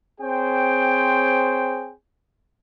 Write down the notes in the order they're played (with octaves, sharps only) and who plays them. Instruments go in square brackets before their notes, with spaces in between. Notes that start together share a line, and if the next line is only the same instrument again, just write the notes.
[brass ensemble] C4 G#4 C5 C#5 G5